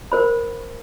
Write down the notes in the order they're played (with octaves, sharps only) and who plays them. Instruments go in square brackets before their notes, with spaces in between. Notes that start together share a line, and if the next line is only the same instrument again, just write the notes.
[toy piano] A#4 C5 B5